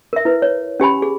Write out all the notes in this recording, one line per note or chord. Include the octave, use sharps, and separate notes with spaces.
A#4 E5
E4 B4
C#5
C#4 G4 G#5 B5
G#4